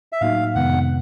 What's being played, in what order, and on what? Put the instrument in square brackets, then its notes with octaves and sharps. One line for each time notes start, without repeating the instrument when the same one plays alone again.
[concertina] E5
[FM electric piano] A2 F#3 A#3 D#4 F#4 [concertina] F5
[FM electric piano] F2 C3 D#3 G#3 B3 [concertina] F#5